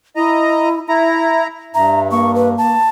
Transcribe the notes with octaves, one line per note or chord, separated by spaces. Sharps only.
E4 D#5 A#5
E4 E5 A#5
G2 E5 A#5
A#3 C#6
B4
A5